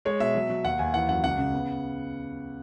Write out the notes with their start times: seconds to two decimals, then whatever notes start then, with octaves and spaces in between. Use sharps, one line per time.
0.05 G#3 C#5
0.20 B2 E5
0.35 F#3
0.50 F#3
0.64 D#2 F#5
0.79 D#2 G#5
0.94 E3 F#5
1.09 F#2 F#5
1.24 C#2 F#5
1.38 C#3
1.53 B3